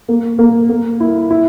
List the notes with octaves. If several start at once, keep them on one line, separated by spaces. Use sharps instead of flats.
A#3
A#3
A#3
E4
E4